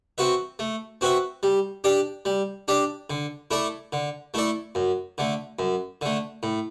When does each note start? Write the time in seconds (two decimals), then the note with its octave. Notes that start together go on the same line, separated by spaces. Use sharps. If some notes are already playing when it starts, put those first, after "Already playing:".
0.18 C4 F#4 B4 E5
0.59 A3
1.01 C4 F#4 B4 E5
1.43 G3
1.84 D4 G4 D5
2.25 G3
2.68 D4 G4 D5
3.10 D3
3.51 A3 E4 A4 D5
3.93 D3
4.34 A3 E4 A4 D5
4.75 F#2
5.18 D3 A3
5.59 F#2
6.01 D3 A3
6.43 A2